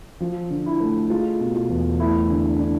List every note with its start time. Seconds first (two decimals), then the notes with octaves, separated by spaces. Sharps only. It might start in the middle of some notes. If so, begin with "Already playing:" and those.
0.20 F3 F4
0.50 D3
0.66 E4
0.80 A3
1.10 G#3 F4
1.40 B2
1.55 F4
1.70 E2
2.00 A3 E4
2.30 D3
2.59 D4